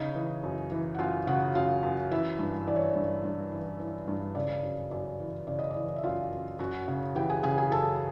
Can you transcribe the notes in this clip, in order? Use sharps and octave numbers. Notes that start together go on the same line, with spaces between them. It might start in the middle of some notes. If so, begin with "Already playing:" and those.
Already playing: C#3 D#4 D#5
E3
F#2
E3
F#5
F#2 F4 F5
C#3 F#4 F#5
F#2 F4 F5
F#2
E3 E4 E5
G2
E3 D5
C#5
G2 C#5
G2
E3
E3
G2
C#3 D5
F#2
F#2 D5
E3
C#3 D5
D#5
D5
E3
E5
F#2 F4 F5
F#2
F#2 F#4 F#5
C#3
E3 G4 G5
G#4 G#5
C#3 G#4 G#5
G#4 G#5
F#2 A4 A5